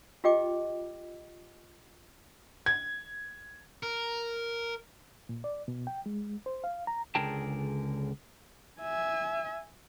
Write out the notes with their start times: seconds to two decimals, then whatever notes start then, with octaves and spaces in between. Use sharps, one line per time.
0.24 F4 G4 D#5 G5 D6
2.66 G#6
3.83 A#4
5.29 A#2
5.44 D5
5.68 B2
5.87 G5
6.06 G#3
6.46 C5
6.64 F5
6.87 A#5
7.15 C#2 D3 G#4 A#4 G5 A5
8.80 E5 G#5